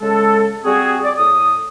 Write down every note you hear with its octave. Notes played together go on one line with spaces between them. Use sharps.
C#3 G#3 A4
G3 C4 F#4 G#4
D5
A2 A4 D#6